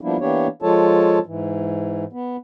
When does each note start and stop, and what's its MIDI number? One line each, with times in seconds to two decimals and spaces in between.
0.01 0.17 53
0.01 0.17 55
0.01 0.17 58
0.01 0.17 59
0.01 0.17 62
0.01 0.17 64
0.21 0.48 52
0.21 0.48 58
0.21 0.48 59
0.21 0.48 62
0.21 0.48 67
0.21 0.48 73
0.62 1.19 53
0.62 1.19 56
0.62 1.19 65
0.62 1.19 69
0.62 1.19 73
0.62 1.19 81
1.26 2.05 44
1.26 2.05 52
2.13 2.37 59